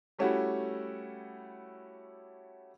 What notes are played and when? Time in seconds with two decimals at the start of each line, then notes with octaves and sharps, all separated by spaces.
0.19 G3 A3 C#4 E4 F#4 G4